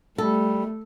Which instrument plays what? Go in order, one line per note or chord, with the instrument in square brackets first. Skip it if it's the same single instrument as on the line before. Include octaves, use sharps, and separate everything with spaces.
[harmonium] G3 [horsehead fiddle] A3 [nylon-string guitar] A4